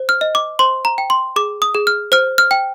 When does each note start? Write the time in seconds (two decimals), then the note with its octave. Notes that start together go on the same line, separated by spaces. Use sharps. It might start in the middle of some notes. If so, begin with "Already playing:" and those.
Already playing: C5
0.09 F6
0.21 D#5
0.35 D6
0.59 C5 C6
0.85 A#5
0.98 G5
1.10 C6
1.36 G#4 D6
1.62 D#6
1.74 G#4
1.87 F6
2.12 C5 F6
2.38 F6
2.51 G5